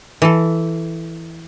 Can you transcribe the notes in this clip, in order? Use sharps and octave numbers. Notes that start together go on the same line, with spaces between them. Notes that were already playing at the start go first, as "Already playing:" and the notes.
E3 A4